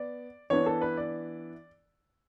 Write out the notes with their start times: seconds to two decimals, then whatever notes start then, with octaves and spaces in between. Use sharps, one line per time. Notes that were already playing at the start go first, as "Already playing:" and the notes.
Already playing: B3 D5
0.50 E3 B3 D4 C#5
0.66 A4
0.81 B4
0.97 D5